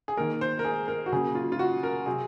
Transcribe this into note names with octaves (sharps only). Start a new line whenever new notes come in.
G#4
D#3 A#3 A#4
C5
A#4
G#4
A#4
F#4
C#3 F#3 A#3 G#4
F4
F4
F#4
A#4
C3 F#3 C4 G#4